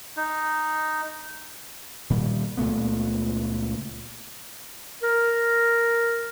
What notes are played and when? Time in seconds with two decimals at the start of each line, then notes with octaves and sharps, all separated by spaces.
0.17 D#4
2.10 A#2 D#3 G3
2.57 C#2 A#2 A3 B3
5.03 A#4